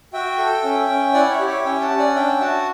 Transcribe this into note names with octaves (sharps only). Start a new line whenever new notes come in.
F#4 E5 G5
A4
C#4
C#4
E4 D5 F#5
C#5 E5
G4
C#5 E5
C#4 E5 G5
F#5 A5
C#4
D5 F#5
D4 E5 G5
F#4 F#5 A5